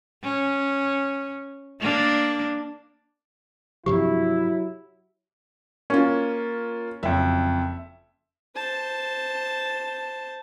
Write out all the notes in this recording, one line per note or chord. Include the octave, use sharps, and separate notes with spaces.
C#4
A#3 D4
G2 C3 F3 F#3 E4 G4
A#3 C#4 F4
F#1 F2 E5
C5 A5